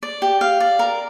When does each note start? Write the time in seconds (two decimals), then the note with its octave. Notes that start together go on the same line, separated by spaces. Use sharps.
0.03 D5
0.22 G4
0.41 F5
0.60 D5
0.79 A#4